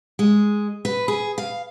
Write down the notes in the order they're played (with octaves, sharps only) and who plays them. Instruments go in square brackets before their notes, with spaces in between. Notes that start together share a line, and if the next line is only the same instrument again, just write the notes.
[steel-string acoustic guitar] G#3
B4
G#4
F5